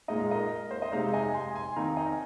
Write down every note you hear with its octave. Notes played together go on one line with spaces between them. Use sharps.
A#2 G#3 D#4 D#5
F5
A#4 D#5
C5
D#5
C3 G#3 D#4 C5 F5
D#5 G#5
G#5 C6
G#5 C6
D#3 C4 D#4 F5 A#5
D#5 G#5